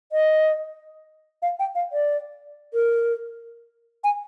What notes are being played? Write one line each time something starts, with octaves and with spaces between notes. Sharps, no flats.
D#5
F5
G5
F5
D5
A#4
G#5